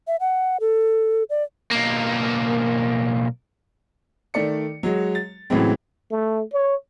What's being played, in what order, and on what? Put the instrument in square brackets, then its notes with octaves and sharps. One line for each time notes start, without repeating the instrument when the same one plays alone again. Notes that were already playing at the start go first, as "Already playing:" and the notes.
[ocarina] E5
F#5
A4
D5
[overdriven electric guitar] B1 A#3
[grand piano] D#3 A3 D5 C#7
F#3 G#3
A6
A2 C#3 E3 F#3 G#3 C4
[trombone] A3
C#5